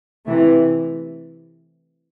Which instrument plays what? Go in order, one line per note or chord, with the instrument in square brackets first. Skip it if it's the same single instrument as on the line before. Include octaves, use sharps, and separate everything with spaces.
[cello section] C3 E3 A3